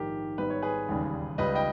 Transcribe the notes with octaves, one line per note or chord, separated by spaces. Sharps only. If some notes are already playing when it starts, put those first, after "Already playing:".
Already playing: A#1 G#2 D#3 G4 A#4
G#1 G#2 G3 B3 B4
C#5
G#4 B4
E1 D#2 C#3 G3
C#2 C#3 G3 B4 D#5
D#5 G5